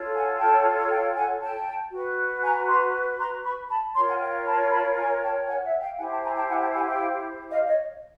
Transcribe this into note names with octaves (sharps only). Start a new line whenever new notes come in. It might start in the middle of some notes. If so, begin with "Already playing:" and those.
Already playing: F4 A4 C#5
F#5 G#5
G5 A5
F5 G5
F#5 G#5
G5 A5
F#4 B4
G#5 A#5
A#5 C6
A#5 C6
B5 C#6
A5 B5
F4 A#4 C#5 A#5 C6
F#5 G#5
F5 G5
A5 B5
A5 B5
G#5 A#5
G5 A5
F#5 G#5
E5 F#5
F5 G5
E4 G4 C5 F#5 G#5
G5 A5
G#5 A#5
G5 A5
F#5 G#5
G5 A5
F#5 G#5
F5 G5
D#5 F5
C#5 D#5